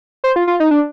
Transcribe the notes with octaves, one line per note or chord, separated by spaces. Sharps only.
C5
F4
F4
D#4
D4